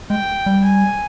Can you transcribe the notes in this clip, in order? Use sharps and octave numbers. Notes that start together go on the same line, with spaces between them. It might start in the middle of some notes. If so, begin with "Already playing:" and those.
G#3 G5
G3
G#5